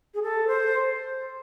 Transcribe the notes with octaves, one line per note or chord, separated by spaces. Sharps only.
G#4
A4
C5